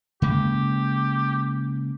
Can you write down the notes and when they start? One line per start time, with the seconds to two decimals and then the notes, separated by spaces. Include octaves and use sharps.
0.22 C#3 G#3 A#3 G4